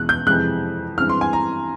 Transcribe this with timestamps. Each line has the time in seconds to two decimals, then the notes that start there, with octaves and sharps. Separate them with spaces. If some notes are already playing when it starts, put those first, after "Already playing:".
Already playing: E2 B2 G#3 B3 F#6
0.09 G6
0.27 F2 C3 E3 G#3 F#6
0.98 G2 E3 G#3 C4 F6
1.09 C6
1.21 G#5
1.33 A#5